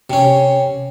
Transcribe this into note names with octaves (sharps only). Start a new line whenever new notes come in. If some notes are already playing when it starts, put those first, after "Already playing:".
C3 C#4